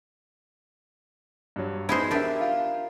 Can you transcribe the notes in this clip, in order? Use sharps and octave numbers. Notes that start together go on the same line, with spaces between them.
G2 F#3
B3 D#4 E4 G#4 C5
D4 G4 A#4 E5
F4